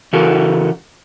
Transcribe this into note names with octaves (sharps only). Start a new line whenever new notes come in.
C#3 E3 F#4 A4 A#4